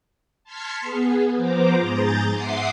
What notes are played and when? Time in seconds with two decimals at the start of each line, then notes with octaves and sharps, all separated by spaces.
0.44 A5 C6 F6 G#6 B6 C#7
0.81 B3 G#4
1.36 F3 B3 C5 A#5 D6
1.80 G#2 G#4 A#5 G6 A6
2.32 E5 F#5 C6 D6 D#6 C7